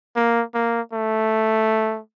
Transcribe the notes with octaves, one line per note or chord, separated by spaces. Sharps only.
A#3
A#3
A3